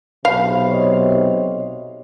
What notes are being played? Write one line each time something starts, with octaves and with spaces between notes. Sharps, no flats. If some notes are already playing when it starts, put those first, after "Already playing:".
B1 C3 F5 B5
C#5 D#5